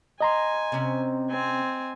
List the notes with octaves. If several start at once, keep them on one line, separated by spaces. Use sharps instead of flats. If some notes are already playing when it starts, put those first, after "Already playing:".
D#5 G#5 A#5 C6
C3 C#4
C4 G#5